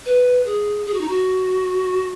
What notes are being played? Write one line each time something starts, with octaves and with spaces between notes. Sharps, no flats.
B4
G#4
G#4
F#4
D#4
F#4